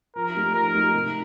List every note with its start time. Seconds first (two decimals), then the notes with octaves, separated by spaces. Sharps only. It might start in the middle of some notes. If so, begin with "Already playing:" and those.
0.16 F3 A#4
0.35 A3 D#4 G4
0.54 F3 A#4
0.74 A3 D#4 G4
0.93 C3